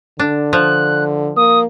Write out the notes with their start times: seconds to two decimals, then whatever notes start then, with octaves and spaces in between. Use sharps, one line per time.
0.19 D3 D4
0.53 F3 F#6
1.37 A#3 D#6